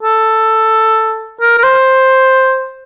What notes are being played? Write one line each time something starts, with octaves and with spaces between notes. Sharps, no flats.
A4
A#4
A#4
C5